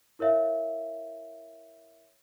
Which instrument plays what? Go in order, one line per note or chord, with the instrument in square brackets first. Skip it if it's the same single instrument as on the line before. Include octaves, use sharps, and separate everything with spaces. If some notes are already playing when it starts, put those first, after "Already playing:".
[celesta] E4 A#4 C#5 E5 F5